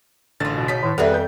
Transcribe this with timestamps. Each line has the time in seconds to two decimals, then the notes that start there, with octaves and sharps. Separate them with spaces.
0.40 A1 D3 D#3 F4 A6
0.53 B2
0.68 C#3 D#4 B6
0.83 A2 D#3
0.98 F2 G3 B3 G#4 A4 B4 D5 E5
1.14 G6